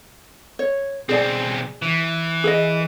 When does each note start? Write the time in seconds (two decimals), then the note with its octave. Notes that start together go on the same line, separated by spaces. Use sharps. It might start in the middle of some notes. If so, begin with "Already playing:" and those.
0.59 C#5
1.09 B1 C4 G#4 D5 G#5
1.82 E3
2.44 G#4 B4 D#5